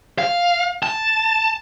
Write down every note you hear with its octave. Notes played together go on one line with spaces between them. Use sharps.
F5
A5